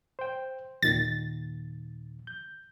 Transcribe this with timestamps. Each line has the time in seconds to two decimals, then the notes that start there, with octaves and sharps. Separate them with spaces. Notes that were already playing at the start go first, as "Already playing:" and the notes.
0.19 C5 G5
0.83 D#2 A#2 D#3 A6
2.27 G6